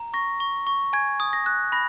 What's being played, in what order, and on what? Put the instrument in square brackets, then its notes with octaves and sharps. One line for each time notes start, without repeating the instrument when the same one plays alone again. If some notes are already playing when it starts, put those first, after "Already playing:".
Already playing: [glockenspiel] A#5
C#6 A#6
C#6
C#6
G#5 G#6
D#6
A#6
F#6
B5 A#6